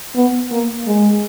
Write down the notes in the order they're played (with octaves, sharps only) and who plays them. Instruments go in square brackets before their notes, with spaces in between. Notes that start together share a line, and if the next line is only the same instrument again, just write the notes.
[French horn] B3
A#3
G#3